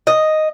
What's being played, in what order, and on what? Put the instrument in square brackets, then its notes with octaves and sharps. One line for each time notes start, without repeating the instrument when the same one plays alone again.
[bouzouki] D#5